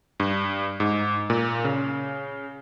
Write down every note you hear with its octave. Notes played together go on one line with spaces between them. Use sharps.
G2
G#2
A#2
C#3